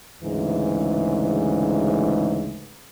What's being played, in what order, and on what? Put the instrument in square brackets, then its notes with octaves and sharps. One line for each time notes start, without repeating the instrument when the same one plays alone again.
[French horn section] D2 G#2 C#3 E3